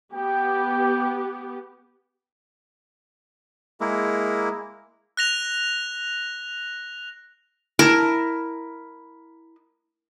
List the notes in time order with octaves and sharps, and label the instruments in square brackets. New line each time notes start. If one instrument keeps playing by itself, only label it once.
[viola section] B3 G4 [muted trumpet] G5
[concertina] G#3 A#3 E4
[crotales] F#6 A#6 F7
[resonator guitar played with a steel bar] E4 A5 [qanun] A#4